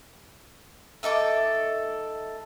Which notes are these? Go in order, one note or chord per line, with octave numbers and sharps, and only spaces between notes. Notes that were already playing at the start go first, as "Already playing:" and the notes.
A3 D#4 A4 D6